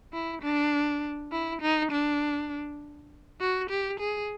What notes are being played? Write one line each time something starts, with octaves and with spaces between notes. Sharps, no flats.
E4
D4
E4
D#4
D4
F#4
G4
G#4